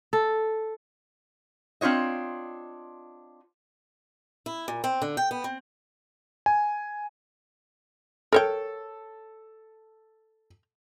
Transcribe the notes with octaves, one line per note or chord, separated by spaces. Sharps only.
A4
C4 D4 F4 C#5 D#5
E4
A#2
C4
D3
G5
B3
C4
G#5
A4 A#4 C#5 G5